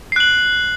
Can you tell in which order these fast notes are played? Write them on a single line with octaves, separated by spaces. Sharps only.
C7 F#6 F#7